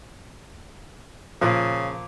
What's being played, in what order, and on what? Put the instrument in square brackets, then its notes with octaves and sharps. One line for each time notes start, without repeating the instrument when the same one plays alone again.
[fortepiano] A#2 F3 [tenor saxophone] C#3